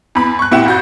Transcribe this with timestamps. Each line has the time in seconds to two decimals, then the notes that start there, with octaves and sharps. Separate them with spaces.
0.15 E2 B5
0.39 C#6 F#6
0.52 A#2 E4 G4 F#5 E7
0.66 F2 F#4 G6